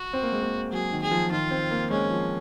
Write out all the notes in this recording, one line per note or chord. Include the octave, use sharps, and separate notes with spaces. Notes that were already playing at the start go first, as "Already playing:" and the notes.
Already playing: F#4
C4
A#3
G#3
A#3
F#3 G#4
D#3
G#4
F3
D#3 F4
C4
A#3
G#3 C#4
F3